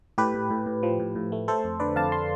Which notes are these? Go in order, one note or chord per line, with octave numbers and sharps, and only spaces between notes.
A2 G4 B4
A2
A2
A2
F3
A2
A2
A3
A3 A4 C5
F2
D3 B4 D5
F2 F5 A5
A5 C6